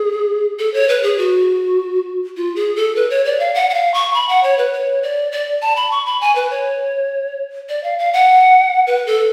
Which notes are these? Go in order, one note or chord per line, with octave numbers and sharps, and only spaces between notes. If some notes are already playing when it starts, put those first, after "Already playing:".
Already playing: G#4
A4
C#5
B4
G#4
F#4
F4
G#4
A4
B4
C#5
D5
F5
F#5
F#5
F5
C#6
B5
F#5
C#5
B4
C#5
D5
D5
A5
B5
C#6
B5
G#5
B4
C#5
D5
F5
F5
F#5
B4
A4